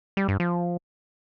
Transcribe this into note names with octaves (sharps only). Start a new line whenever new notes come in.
G3
G2
F3